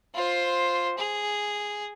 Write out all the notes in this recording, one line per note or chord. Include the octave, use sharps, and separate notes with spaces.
F4 C5
G#4